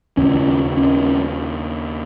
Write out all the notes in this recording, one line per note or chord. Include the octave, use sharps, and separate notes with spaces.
D#2 C#3 C#4
C#4